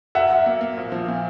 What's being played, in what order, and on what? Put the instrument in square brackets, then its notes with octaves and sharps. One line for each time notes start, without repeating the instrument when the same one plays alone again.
[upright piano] F#2 [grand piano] E5 F#5
[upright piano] F#2
A#3
A#3
A#1
F3
A#2